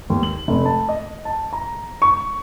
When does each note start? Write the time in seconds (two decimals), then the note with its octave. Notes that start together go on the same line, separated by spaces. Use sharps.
0.10 D#2
0.23 F#7
0.48 F1
0.65 A5
0.89 D#5
1.25 A5
1.53 A#5
2.02 C#6